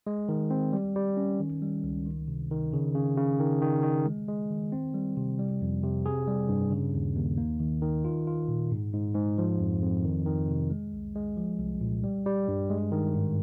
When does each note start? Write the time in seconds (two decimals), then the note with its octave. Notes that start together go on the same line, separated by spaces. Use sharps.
0.07 G#3
0.29 D#3
0.50 C4
0.73 G3
0.96 G3
1.17 C#4
1.40 D#3
1.62 G3
1.84 C#2
2.06 D#3
2.28 C3
2.51 D#3
2.73 C#3
2.95 C#3
3.17 C#3
3.40 D#3
3.62 D#3
3.83 D#3
4.06 G#3
4.28 G#3
4.51 D#3
4.72 C4
4.94 G3
5.17 C3
5.39 G3
5.61 F2
5.83 C3
6.06 G#4
6.27 G3
6.49 G2
6.72 C#3
6.94 D#2
7.16 D#2
7.37 A#3
7.60 D#3
7.82 D#3
8.05 F4
8.27 F4
8.48 A#2
8.71 G#2
8.94 G#2
9.15 G#2
9.38 F3
9.59 F2
9.82 F2
10.04 D#3
10.26 D#3
10.49 C3
10.70 G#3
10.93 C2
11.15 G#3
11.37 F3
11.59 C2
11.81 A#2
12.04 G3
12.26 G3
12.48 G2
12.70 G#3
12.92 D#3
13.15 G#2